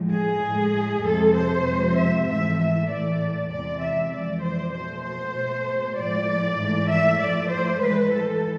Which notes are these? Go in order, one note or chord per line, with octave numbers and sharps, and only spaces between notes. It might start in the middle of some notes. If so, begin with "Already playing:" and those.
Already playing: A2 F3 G#3
G#4
A2 G#3
F2 C3 G#3 A4
C5
F2 C3 F3 G#3
E5
G#2 E3 A3 E5
E5
A2 E3 A3 D5
E2 C3 G#3 D5
E5
F2 E3 G#3 D5
C5
B2 A3 C5
C5
B2 A3
A2 F3 G#3 D5
G#2 E3 A3
E5
A2 F3 A3 D5
C5
A2 E3 G#3 B4
A4